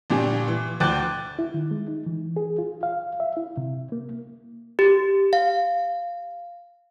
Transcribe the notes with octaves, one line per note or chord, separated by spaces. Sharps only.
G1 A#2 D4 G4 G#5
E3
D2 G5 D6 F#6 G6 A6
E4
D#3
G#3
D#4
E3
G#4
F4
F5
E5
E4
C3
A#3
G4
F5